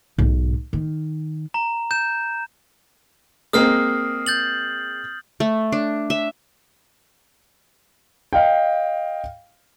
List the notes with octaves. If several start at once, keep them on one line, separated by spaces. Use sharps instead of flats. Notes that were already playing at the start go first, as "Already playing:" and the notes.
B1 G#2
D#3
A#5
G6 E7
G#3 A#3 C4 D#6 F6 C7
G6 A6 F#7
A3
D4
E5
D#5 F5 G5